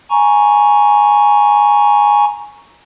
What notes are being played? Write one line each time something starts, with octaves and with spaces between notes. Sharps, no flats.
G#5 A#5 C#6